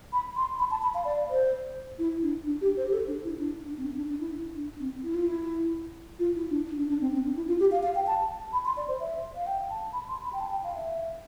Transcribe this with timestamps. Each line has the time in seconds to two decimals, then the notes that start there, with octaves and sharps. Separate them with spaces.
0.13 B5
0.36 C6
0.59 B5
0.71 A5
0.82 B5
0.94 F5
1.05 D5
1.29 C5
1.99 E4
2.22 D4
2.46 D4
2.61 G4
2.77 C5
2.86 G4
2.93 A4
3.07 D4
3.24 E4
3.39 D4
3.62 D4
3.77 C4
3.86 D4
3.97 D4
4.10 D4
4.20 E4
4.55 D4
4.80 C4
5.03 E4
5.14 F4
5.27 E4
6.19 F4
6.36 E4
6.51 D4
6.78 D4
6.89 D4
7.01 C4
7.13 C4
7.25 D4
7.36 E4
7.48 F4
7.60 G4
7.71 F5
7.83 F5
7.95 G5
8.07 A5
8.53 B5
8.65 C6
8.77 D5
8.88 C5
9.00 E5
9.35 F5
9.47 G5
9.70 A5
9.93 B5
10.09 C6
10.24 B5
10.33 G5
10.40 A5
10.51 G5
10.64 F5
10.75 E5